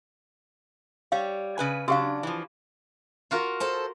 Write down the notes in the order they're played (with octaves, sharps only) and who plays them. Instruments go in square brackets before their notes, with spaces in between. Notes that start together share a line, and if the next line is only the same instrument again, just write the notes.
[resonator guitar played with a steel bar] G3 C#5 [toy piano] F5
[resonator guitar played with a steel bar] C#3 B4 G#5
[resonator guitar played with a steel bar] C#3 F#3 D4 [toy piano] F#4 G4 F5
[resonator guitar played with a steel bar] E3 F3
[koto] F4 F#4 A#4
[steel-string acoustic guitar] A4 C5 A5